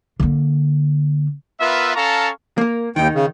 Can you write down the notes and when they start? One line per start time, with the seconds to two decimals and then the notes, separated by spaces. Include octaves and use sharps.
0.20 D3 A#3
1.60 B3 F4 A#4 B4 E5
1.96 C#4 A4 F5 A5 A#5 C#6
2.58 A#3 A#4
2.96 D#2 D#3 D#4 G5
3.14 C#3